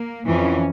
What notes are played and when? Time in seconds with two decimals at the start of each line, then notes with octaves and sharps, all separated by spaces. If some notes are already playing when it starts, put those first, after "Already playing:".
Already playing: A#3
0.26 F2 E3 C#4